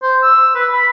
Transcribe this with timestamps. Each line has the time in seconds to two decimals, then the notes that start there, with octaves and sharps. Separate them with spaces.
0.03 C5
0.23 E6
0.55 B4
0.73 B5